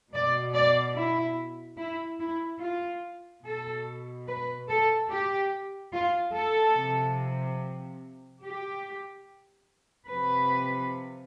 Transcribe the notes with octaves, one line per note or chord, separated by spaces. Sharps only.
B2 D5
D5
E4
E4
E4
F4
B2 A4
B4
A4
G4
F4
A4
C3 F3
G4
C3 F3 B4